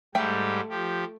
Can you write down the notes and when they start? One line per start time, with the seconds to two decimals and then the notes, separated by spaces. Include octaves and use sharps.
0.15 G#2 G3 A3 G4 A4 G5
0.69 F3 G4